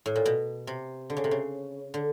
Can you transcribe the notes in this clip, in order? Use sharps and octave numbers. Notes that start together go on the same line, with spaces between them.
A2
A#2
B2
C3
D3
C#3
C3
C#3
D3